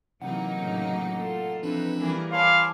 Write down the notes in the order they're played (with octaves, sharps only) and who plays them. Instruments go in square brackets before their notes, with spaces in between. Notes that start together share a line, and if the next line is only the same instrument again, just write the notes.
[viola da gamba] C3 E3 [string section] F#3 A#3 D#4 [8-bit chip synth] F#5
[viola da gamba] A2 C#3
F4 A4
[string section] E3 D#4 B4 [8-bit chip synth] F3 C4 D4
[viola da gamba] E3 G3 A#4 [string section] A#3 E4 G#4
[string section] C#5 G#5 D6 [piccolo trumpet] F5 [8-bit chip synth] A5 B5 C6